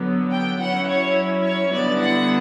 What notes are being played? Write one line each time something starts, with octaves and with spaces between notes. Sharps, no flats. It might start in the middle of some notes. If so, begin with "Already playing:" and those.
Already playing: D3 F#3 B3
G5
F#3 C#4 E4 F#5
C#5
C#5
D3 G3 B3 E4 D5
F#5